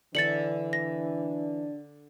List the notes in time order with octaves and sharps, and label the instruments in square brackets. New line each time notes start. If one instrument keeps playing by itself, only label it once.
[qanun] D3 E5 [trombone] E3 [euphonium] D4 [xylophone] A6 C#7 F#7
[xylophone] A#6